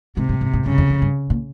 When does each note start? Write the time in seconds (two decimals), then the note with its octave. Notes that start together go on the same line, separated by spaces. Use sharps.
0.17 G#2 C3
0.29 G2
0.41 G#2
0.53 G#2
0.65 G2 C#3
0.78 F2
0.90 F2
1.02 G2
1.30 A#2